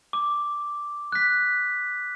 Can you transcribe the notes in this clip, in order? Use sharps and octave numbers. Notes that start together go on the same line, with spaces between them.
D6
F#6 B6